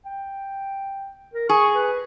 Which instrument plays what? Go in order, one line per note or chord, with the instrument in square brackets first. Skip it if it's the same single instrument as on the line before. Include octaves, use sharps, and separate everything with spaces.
[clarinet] G5
A#4
[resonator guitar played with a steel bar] G#4 [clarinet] C#6
[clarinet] B4